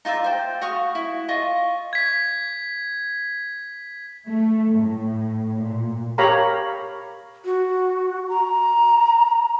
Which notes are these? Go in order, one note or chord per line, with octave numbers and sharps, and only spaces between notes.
D#4 F4 D5 E5
C5 G5
F#4 F5 C#6 D#6
E4
F4 D#5 C#6
G#6 B6
A3
A2
A#2
G4 A#4 C#5 F5 A#5 B5
F#4
A#5